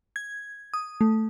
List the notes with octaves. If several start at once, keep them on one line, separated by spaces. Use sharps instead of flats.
G#6
D#6
A3